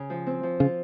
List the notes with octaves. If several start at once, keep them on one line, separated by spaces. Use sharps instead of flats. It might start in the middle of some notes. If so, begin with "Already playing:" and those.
Already playing: C#3
F3
C4
F3
C#3 F4